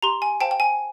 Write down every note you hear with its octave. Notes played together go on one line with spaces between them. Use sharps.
G4 A#5 C6
G#5
C5 F5 G5 A5
G5
G#5